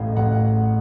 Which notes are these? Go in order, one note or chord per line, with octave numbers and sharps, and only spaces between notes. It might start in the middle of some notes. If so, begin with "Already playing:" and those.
Already playing: A1 A2 A3 D#5 F5
A1 F#5